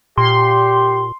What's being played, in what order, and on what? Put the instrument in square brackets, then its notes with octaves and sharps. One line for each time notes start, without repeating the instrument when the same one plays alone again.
[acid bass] A#2 [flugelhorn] G4 [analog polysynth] C6